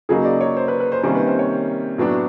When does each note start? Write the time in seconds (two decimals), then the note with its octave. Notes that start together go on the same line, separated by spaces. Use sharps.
0.09 C#3 F#3 A#3 D#4 G#4
0.25 D5
0.41 C#5
0.57 C5
0.68 B4
0.80 B4
0.92 C5
1.03 C3 D#3 G3 A#3 C#4 C5
1.15 B4
1.27 C5
1.39 C#5
1.98 A2 F#3 B3 D4